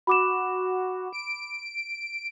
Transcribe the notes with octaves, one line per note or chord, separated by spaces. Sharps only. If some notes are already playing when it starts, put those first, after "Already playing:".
F#4 B5 D6 E7
D7